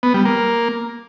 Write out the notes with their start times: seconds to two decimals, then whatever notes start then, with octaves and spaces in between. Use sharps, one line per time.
0.03 B3
0.14 G3
0.25 A#3